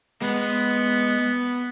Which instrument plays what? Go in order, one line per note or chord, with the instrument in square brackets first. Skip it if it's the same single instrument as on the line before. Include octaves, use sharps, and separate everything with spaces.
[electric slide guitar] G#3 [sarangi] B3